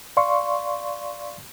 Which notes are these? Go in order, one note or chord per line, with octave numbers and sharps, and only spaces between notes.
D5 F5 C6 C#6